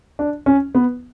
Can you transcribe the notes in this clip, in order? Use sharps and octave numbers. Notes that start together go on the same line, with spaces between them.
D4
C#4
B3